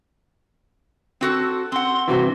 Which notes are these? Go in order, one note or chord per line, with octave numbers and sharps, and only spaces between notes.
C4 F#4 A4
C4 F#5 C6
G2 C3 E3 F#4